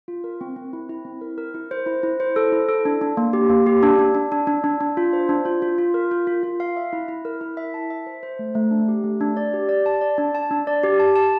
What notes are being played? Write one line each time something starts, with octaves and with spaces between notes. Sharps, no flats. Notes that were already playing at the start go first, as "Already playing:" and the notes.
F4
A#4
C4
C4
E4
E4
C4
A#4
A#4
E4
C5
E4
E4
C5
A4
E4
A4
D4
D4
A#3
G4
A#3
G4
D4
D4
D4
D4
D4
D4
D4
F4
C5
D4
F4
F4
F4
A#4
F4
F4
F4
F5
E5
E4
E4
A#4
E4
E5
A5
E5
C5
C5
A3
A3
D4
G4
A3
D4
D5
G4
D5
A5
D5
D4
A5
D4
D5
G4
A5
A5